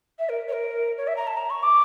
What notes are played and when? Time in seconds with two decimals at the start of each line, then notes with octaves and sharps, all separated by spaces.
0.19 E5
0.29 A#4
0.48 C#5
0.52 A#4
0.97 C#5
1.07 E5
1.16 A#5
1.27 A5
1.37 A#5
1.50 C#6
1.63 D6